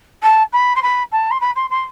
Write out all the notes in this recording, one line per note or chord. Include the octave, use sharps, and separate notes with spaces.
A5
B5
C6
B5
A5
C6
B5
C6
C6